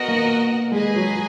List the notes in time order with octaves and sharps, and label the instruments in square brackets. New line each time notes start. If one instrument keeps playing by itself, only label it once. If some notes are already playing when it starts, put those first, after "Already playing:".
Already playing: [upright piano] B3 [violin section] F#4 A#4 D#5 F#5
[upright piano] A#3
[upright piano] G#3 [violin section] G#4 B4 D#5 G#5
[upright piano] F#3